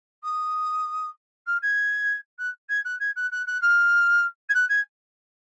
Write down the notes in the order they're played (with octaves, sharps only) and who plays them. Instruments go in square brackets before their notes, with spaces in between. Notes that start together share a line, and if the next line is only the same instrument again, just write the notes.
[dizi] D#6
F6
G#6
F#6
G#6
F#6
G#6
F#6
F#6
F#6
F6
G#6
F#6
G#6